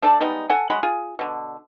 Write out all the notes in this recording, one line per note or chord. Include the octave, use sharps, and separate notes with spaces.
A3 D4 A4 D5
G3 G#3 B3 D#4
A4 F#5 G#5
F#3 G#3 F#5 B5
F4 G#4
B2 D3